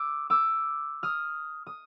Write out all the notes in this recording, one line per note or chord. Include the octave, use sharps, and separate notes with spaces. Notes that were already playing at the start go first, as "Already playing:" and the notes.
Already playing: D6 E6
D6 E6
D#6 F6
D#6